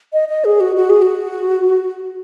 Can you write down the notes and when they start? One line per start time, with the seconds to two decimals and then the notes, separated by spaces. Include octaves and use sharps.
0.13 D#5
0.29 D#5
0.45 G#4
0.60 F#4
0.76 F#4
0.90 G#4
1.02 F#4